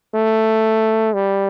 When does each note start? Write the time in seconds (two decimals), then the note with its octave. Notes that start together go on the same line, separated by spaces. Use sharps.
0.15 A3
1.13 G3